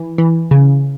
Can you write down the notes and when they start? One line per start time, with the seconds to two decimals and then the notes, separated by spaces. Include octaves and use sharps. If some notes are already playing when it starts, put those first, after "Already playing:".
Already playing: E3
0.18 E3
0.51 C#3